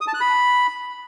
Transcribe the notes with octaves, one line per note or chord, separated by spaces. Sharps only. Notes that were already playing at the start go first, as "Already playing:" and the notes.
D#6
A5
F#6
B5